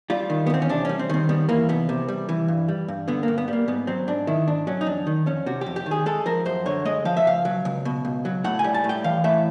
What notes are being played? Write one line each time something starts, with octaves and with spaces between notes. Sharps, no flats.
G3 F4
D#3
B3
E2 C4
C#4
C3 D4
G3 C#4
C4
D#3 C4
G3 B3
E3 A#3
C2 B3
C3
G3
E3
G2
G3
G2
D3 B3
A#3
G2
B3
G3 A#3
G#2 B3
F#3 C4
G#2 D4
D#3 E4
G#2 D4
F#3 C#4
D#4
F2 D4
D#3
F2 C#4
C3 F#4
G4
F2
G4
D#3
G#4
G#3 A4
F3 A#4
F#2 C5
D3 C#5
G#3 D#5
F3 F5
E5
C#2 F5
F#3
C#2
B2
C#2
F#3
A2 F#5
G#5
G3
A5
A2
G5
E3 F5
A2 E5